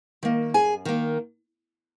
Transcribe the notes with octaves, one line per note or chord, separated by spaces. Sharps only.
D#3 A#3
F#2 G#4 G#5
D#3 A#3